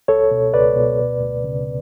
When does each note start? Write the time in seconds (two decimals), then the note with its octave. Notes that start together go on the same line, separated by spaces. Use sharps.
0.08 C#2 A4 C#5
0.31 B2
0.54 C#2 B4 D5
0.76 B2
0.99 D2
1.21 D2
1.44 C#3